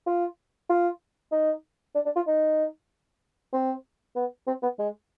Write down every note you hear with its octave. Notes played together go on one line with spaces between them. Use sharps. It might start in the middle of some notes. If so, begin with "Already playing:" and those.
F4
F4
D#4
D4
D4
F4
D#4
C4
B3
C4
B3
G#3